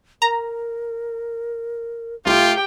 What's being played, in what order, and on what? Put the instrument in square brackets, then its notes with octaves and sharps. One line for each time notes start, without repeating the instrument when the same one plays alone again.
[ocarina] A#4 [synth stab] A#5
[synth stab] C2 [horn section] A3 F4 [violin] G4 G5